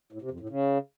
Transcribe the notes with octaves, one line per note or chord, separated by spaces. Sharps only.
A2
C3
F2
A2
C#3